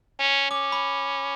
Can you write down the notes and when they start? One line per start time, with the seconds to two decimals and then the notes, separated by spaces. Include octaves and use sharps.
0.19 C#4
0.51 C#4 D6
0.72 B5